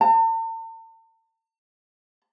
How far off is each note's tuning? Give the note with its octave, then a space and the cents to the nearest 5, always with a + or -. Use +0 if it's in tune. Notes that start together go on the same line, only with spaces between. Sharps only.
A5 +45